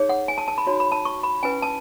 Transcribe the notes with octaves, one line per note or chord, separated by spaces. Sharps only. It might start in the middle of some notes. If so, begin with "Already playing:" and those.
Already playing: D#4 G#4 C#5
F#5
G#5
A5
A5
B5
D#4 F#4 C#5
B5
A5
C#6
B5
C#4 E4 B4 G#5
A5